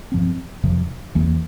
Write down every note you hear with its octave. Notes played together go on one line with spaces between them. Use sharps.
G2 F3 C4
F2 C3 F3
E2 E3 A#3